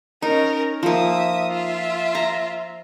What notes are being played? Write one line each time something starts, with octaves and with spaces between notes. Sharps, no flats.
C#4 D#4 A#4
F3 A#3 E5 D#6
F4 E5
A#5